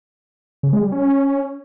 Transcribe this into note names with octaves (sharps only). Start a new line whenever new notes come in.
C#3
G#3
G3
C#4